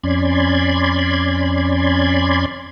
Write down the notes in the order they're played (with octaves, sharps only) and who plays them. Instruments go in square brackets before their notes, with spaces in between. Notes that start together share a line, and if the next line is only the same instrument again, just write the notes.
[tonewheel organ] F2 C#4 D5 B5 C6 G#6